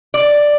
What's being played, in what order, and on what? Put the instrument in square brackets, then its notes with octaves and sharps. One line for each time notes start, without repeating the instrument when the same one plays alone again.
[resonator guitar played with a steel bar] D5